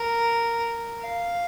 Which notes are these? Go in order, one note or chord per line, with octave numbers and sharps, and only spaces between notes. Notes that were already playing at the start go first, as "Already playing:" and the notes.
Already playing: A#4
F5